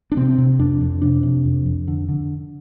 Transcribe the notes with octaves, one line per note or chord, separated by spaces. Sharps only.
D4
C3 C4
C3
F2 D4
F2
C3 D4
C3
F2
F2
D3
D3